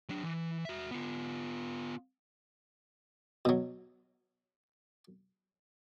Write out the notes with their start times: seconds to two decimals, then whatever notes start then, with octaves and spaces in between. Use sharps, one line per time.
0.09 F#3 D4
0.23 E3
0.65 F#4 E5
0.91 B3 F4
3.45 B2 F#3